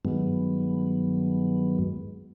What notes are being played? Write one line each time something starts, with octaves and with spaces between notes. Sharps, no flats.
G2 D#3 F#3 G#3 B3